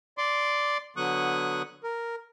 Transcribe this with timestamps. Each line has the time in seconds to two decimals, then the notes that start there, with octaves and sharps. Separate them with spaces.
0.18 D5 C6 D6
0.97 D3 F#3 B3 C#6 D#6 F#6
1.84 A#4